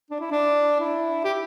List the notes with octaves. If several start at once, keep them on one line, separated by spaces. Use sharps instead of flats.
D4
E4
D4
E4
G4